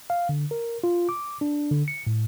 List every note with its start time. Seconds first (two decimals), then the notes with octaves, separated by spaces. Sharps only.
0.10 F5
0.29 D3
0.51 A#4
0.84 F4
1.09 D6
1.41 D4
1.71 D3
1.88 C#7
2.07 A2